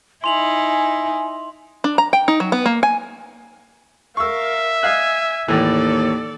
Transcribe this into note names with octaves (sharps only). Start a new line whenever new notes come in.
D#4 E4 G#5 C6 F7 F#7
D4
A#5
G5
D#4
F#3
B3
A#3
G#5
A#4 E5 F5 C#6 E6
D#5 F5 G#5 F#6
D#2 A2 E3 A4 D5